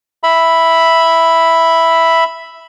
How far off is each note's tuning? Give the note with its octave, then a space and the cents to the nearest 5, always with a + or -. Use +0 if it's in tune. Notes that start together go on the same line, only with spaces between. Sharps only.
E5 +0 B5 +0